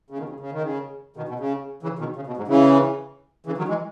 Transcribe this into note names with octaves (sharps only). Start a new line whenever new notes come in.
C#3
B2 D#3
C#3
C#3
D#3
C#3
B2 D#3
B2
C#3
C#3 E3
B2 D#3
C#3
B2
G#2
C#3 E3
C#3 E3
D#3 F#3
E3 G#3